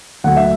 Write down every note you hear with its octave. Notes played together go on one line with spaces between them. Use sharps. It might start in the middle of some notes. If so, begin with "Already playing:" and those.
D2 D3 F#3 A3 F#5
E5